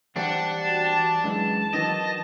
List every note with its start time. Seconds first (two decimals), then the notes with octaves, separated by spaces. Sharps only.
0.16 E3 G3 D4 C5 F#5
0.61 F#4 A5
1.24 F#2 E3 G#3 A5
1.74 D#3 E3 F#3 D#5